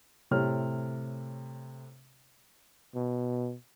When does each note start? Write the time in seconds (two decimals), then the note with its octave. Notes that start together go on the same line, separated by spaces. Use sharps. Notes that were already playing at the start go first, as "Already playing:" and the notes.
0.31 A2 C3 C#5 F6
2.95 B2